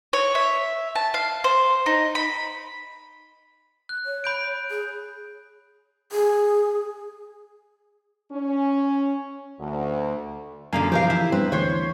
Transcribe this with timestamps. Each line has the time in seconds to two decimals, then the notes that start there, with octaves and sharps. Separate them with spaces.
0.13 C#5
0.35 E5
0.95 A5
1.14 F5
1.44 C5
1.86 D#4
2.15 B5
3.89 F#6
4.06 C#5
4.24 B5 G6 D7
4.70 G#4
6.12 G#4
8.32 C#4
9.59 D2
10.73 F#2 D3 F3 A#3 F5 G#5
10.92 B2 E3 F3 G4 A#4 F5
11.10 E4
11.32 G2 B3 C4 B4
11.52 D2 E3 C5 C#5